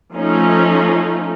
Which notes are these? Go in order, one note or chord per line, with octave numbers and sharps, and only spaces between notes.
F3 A3 C#4 D#4